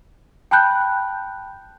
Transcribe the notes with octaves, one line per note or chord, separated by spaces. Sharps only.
G5 A5 B5 F#6 G6